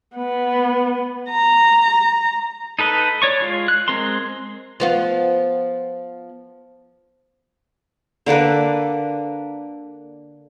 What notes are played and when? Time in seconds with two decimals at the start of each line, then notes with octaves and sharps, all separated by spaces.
0.16 B3
1.30 A#5
2.79 D#4 A4 B4 D#5
3.22 C#5 D5 C#6
3.41 G#3 F4
3.68 F#6
3.88 G#3 C4 A#4 C6
4.80 F3 B3 F4
8.26 D3 A#3 D4 B4